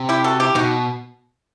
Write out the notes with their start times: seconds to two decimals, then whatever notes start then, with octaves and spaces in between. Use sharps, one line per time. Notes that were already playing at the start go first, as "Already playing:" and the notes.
Already playing: C3
0.09 E4 G4
0.24 F#4 A4
0.40 E4 G4
0.55 B2 D#4 F#4